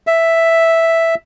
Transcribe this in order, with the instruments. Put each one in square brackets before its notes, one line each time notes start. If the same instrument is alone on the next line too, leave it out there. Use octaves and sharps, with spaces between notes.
[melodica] E5